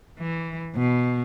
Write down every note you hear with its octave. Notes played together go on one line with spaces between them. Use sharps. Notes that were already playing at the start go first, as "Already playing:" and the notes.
E3
B2